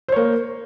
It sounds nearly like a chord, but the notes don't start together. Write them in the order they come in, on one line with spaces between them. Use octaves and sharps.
C5 C#5 A#3